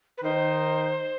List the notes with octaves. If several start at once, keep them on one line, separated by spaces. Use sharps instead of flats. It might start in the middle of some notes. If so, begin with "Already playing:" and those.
B4
D#3 D#4 C5